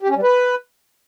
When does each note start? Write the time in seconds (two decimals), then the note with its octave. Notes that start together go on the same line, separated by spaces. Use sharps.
0.02 G4
0.09 C#4
0.16 G3
0.23 B4